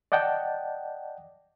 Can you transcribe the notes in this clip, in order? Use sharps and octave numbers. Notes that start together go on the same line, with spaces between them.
D5 D#5 F#5 G5 A5